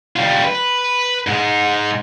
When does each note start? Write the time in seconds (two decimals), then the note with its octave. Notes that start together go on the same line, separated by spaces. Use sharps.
0.16 G3 F4
0.45 B4
1.27 G#2 G#3